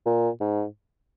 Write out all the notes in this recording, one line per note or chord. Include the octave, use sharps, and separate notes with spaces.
A#2
G#2